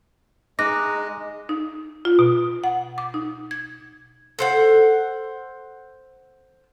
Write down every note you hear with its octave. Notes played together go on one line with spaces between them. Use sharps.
G#3 D#4 D6 F#6 A#6
D#4
F4
B2
F#5
D6
D#4
G#6
A4 C5 F#5